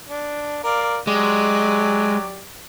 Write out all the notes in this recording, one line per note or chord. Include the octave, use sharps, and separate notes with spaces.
D4
A#4 D5 F5
F#3 G#3 G4 D5